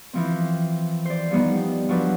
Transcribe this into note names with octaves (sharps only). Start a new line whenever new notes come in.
E3 F3 C4
C5 D5
F3 G3 B3 D#4
F3 F#3 D4 B4